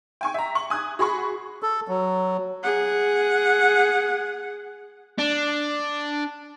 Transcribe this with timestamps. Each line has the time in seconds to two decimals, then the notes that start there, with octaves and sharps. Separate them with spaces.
0.21 G5 G#5 C#6
0.34 E5 A#5
0.55 C#6 F#7
0.70 G#5 D#6 F#6 G#6
0.99 F#4 G#4 B5 C#6
1.63 A4
1.88 F#3
2.63 G#4 F#5
5.18 D4